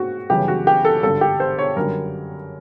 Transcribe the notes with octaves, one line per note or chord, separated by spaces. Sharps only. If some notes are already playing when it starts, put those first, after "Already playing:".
Already playing: G#2 A3 C4 F#4
G1 F#2 C#3 E3 G4
F#4
G4
A4
G#1 G2 D3 A4
G4
C5
C#5
F#2 D3 G3 A#4